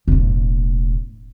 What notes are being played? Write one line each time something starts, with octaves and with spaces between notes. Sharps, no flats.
E1 A2